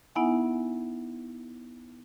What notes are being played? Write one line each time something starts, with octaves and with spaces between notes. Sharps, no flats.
B3 D#4 E4 E5 F#5 G#5